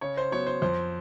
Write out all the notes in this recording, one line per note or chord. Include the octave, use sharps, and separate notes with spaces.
C#3 C#5
C5
F#3 B3 C#5
C5
F2 C5